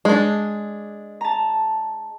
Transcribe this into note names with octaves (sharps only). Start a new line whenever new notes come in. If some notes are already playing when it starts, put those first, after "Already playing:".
G#3 D4
A5 A#5